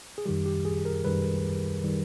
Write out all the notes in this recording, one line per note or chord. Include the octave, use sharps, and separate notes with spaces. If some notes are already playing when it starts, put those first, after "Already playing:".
G#4
F#2 D#3 G3 G4
G4
G#4
A#4
F#2 D#3 G3 B4
D#3 G3